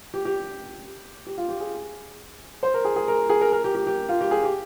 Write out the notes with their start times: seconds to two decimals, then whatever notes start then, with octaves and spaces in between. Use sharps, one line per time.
0.14 G4
0.25 G4
1.27 G4
1.38 F4
1.49 G4
1.60 G#4
2.63 C5
2.74 A#4
2.85 G#4
2.96 G#4
3.08 A#4
3.29 G#4
3.41 A#4
3.52 A#4
3.64 G4
3.75 G4
3.87 G4
4.09 F4
4.21 G4
4.31 G#4
4.43 G4